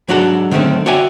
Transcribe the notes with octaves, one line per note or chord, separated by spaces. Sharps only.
G#2 F#3 D4 F#4 A4 F#5
D3 D#3 F#3 G#3 A3 C4
F#4 C#5 D5 E5 G5 G#5